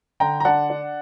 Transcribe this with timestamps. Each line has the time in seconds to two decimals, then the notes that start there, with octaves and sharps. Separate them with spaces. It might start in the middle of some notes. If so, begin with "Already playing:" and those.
0.20 D3 G5 A#5
0.40 A#5
0.45 D4 F#5 A5
0.70 D4